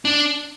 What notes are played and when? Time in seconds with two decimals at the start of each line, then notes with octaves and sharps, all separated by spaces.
0.05 D4